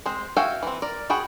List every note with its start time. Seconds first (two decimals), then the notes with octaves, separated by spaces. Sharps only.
0.06 G#3 C4 C5
0.37 F#4 E5 F5 G5 G#5
0.63 E3 C4
0.82 A#4 D5
1.10 F#4 G#4 G5 B5